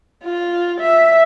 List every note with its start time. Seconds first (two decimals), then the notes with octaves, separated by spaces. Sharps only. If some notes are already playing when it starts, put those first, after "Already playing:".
0.24 F4
0.81 E5